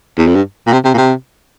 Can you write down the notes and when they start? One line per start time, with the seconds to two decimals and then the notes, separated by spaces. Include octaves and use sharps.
0.18 E2
0.27 F2
0.35 G2
0.67 A#2
0.73 C3
0.85 C3
0.94 A#2
0.98 C3